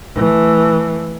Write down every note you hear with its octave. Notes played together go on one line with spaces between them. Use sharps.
E3 A3